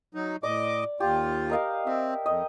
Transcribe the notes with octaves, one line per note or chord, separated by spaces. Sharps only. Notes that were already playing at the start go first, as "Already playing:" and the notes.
F#3 D#4
A2 D5 D#5 D6
D#2 F4 G4
A#4 D#5 F5
C4 E5
F2 D#5